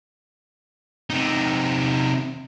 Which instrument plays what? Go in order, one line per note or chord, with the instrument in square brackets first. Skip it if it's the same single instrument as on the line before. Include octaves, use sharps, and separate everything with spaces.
[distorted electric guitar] C3 D#4